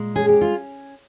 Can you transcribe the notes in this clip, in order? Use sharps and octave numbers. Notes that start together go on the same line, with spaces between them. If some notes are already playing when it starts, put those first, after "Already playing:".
Already playing: A#2 G#3
C#4 G#4
G4
F4